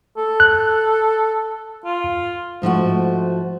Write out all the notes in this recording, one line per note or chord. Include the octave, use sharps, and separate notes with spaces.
A4
F#6
F4
G#2 F3 A3 F#4